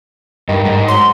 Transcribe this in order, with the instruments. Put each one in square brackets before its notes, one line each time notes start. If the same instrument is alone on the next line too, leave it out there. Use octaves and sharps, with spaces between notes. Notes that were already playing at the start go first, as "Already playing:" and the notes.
[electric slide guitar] G2 [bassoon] D#3
[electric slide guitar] G#2 [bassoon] D#3
[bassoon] F#3 [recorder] C6